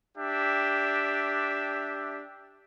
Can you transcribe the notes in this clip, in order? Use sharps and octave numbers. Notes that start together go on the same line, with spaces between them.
D4 G4 E5